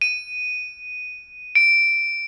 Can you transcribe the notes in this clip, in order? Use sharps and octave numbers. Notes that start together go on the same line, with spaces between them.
D#7
D7